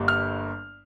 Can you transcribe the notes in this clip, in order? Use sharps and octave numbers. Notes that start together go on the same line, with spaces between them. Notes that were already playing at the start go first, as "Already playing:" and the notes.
Already playing: G1 G2 G3 A#3
F6